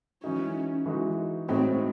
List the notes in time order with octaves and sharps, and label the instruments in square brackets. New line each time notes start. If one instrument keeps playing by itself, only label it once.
[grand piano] E3 G#3 D#4 F#4 [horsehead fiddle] C#4
[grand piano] E3 G#3 D#4 F#4
[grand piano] A2 G#3 D#4 F#4 [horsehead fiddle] C4